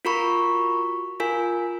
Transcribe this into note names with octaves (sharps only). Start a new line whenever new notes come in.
F4 F#4 A#4 A#5 B5 C#6
F4 A#4 G#5